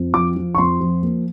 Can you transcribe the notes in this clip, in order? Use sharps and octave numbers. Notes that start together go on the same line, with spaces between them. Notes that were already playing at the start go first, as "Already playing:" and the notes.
Already playing: F2
F3 D6
F3
C#6
F2 C6
F3
A#3